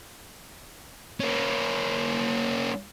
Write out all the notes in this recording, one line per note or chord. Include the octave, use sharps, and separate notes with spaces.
A#3 C#4